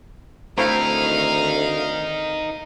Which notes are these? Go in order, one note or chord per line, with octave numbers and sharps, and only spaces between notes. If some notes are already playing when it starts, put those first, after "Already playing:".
D2 A3 C4 D#4 E4 A#4 F5